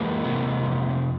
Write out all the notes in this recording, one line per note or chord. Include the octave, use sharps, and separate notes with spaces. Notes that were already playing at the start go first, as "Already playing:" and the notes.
Already playing: F2 E3 G#3 A#3
C3
F2